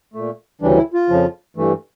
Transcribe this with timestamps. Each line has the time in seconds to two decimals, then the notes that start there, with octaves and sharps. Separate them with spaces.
0.14 A#2 A3
0.61 D2 C#3 E3 G3 D4
0.77 E4
0.94 F4
1.09 F2 C#3 F3
1.57 G2 E3 A3